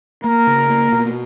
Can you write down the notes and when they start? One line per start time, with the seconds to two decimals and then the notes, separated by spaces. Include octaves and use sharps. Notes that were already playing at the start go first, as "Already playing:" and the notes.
0.24 A#3 A#4
0.47 C#3
0.70 A#3
0.92 B2